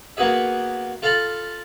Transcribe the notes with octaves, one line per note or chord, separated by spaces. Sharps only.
A#3 B3 F#4 G#4 E5
F4 A4 F5 A5 B5